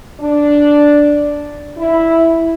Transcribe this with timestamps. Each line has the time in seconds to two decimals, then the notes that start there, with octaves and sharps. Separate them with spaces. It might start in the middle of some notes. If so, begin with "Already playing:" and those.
0.21 D4
1.77 E4